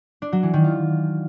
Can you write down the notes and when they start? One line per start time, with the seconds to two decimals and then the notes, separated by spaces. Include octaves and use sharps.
0.22 D4
0.32 F#3
0.43 E3
0.54 D#3
0.64 F4